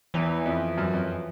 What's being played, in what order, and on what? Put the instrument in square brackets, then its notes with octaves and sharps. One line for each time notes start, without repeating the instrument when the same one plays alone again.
[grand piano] E2 [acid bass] E3
[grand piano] F2
F#2
F2